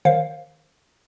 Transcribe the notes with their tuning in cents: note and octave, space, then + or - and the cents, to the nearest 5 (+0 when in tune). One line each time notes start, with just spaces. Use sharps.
D#3 +0 C5 +20 F5 +0